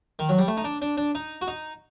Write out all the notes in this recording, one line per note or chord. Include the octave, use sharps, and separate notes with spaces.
D#3
F#3
G3
A3
D#4
D4
D4
D4
D#4
F#4
D#4